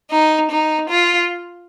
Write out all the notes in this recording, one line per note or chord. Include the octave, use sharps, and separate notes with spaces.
D#4
D#4
F4